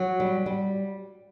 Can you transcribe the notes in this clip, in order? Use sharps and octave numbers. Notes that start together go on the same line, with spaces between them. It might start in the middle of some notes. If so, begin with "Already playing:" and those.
Already playing: F#3
G3
G3